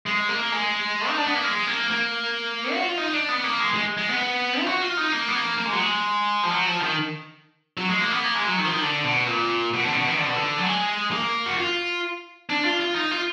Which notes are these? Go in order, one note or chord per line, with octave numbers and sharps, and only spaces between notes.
G#3
A#3
G#3
D#4
D4
B3
A#3
G#3
A#3
A#3
F#4
F4
D#4
D4
B3
A#3
G#3
G#3
G#3
B3
F4
F#4
F4
D#4
A#3
B3
A#3
A#3
G#3
F#3
G#3
F3
F#3
F3
D#3
F#3
G#3
A#3
B3
A#3
G#3
F#3
D#3
F3
D#3
D3
B2
A#2
B2
D3
B2
D#3
D3
B2
D3
F#3
G#3
A#3
F#4
F4
D4
F4
F4
D#4
F4